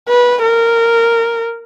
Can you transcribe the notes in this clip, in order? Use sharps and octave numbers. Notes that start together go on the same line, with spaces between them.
B4
A#4